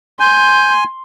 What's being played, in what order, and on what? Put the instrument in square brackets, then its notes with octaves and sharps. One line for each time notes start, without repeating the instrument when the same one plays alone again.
[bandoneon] G#5 [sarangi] C6 [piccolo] G6